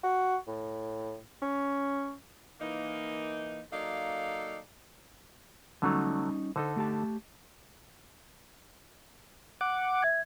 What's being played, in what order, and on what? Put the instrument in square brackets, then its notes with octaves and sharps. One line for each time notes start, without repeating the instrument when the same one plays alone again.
[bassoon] F#4
A2
C#4
[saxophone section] E3 A#3 D#4
F#3 A#3 D#4 A4 D5 F5
[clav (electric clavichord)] D3 F#3 A3 [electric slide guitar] G3 C#4 D#4
[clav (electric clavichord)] D3 D#4 A4 [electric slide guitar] C5
[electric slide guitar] A3 G4 A5
[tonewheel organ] F#5 D6
[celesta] E5 G#6